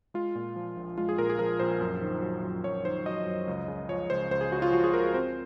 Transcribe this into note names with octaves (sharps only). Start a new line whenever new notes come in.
G#3 F4
A#2
F3
A#1
G#3 F4
G#4
A#2 A#4
G#4
F3 A#4
A#1 C5
F#2
D#3
F#3
F#2
F#2 C#5
D#3 C5
F#3 D#5
F#2
C#2
C#3
F3 C#5
C#2 C5
C#2 C5
G#4
C#3 F#4
F4
F3 F#4
G#4
C#2 A#4
G#4
C4 C5